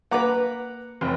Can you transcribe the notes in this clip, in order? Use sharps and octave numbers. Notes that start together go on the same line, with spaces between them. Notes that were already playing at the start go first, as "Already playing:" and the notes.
A#3 B4 F#5 A#5 D6
F1